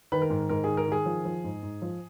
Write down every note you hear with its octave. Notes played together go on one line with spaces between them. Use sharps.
D#3 B4
A#4
G#2
G#2 A#4
D#3 G#4
A#4
D#3 G#4
F3
F3
G#2
G#2
F3